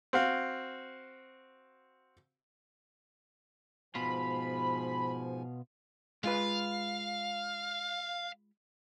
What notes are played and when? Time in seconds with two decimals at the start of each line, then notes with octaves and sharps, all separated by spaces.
0.13 C4 F#4 F5
3.95 G#2 B2 F3 F4 G#5 B5
6.24 G#3 F4 B4 F5